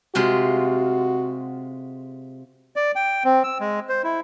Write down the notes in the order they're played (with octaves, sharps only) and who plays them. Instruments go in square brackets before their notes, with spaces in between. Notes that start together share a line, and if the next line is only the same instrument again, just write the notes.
[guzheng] C3 G#3 F4 [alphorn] F#4
[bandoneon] D5
G5
C4
E6
G#3
C5
E4